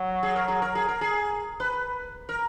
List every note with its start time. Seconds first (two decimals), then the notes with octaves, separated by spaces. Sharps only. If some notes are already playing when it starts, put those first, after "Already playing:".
Already playing: F#3
0.23 G#4
0.36 A#4
0.48 G#4
0.62 A#4
0.75 G#4
0.88 A#4
1.01 G#4
1.60 B4
2.29 A#4